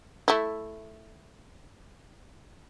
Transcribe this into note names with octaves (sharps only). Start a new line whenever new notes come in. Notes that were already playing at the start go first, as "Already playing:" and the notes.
A3 E4